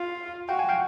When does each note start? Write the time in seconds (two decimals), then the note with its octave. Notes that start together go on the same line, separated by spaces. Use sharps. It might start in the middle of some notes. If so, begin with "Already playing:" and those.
Already playing: F4
0.49 F#4 F5 G5
0.59 F#5 G#5
0.69 F5 G5